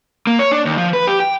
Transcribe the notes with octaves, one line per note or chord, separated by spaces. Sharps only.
A#3
C#5
D4
D#2
F3
B4
G4
G5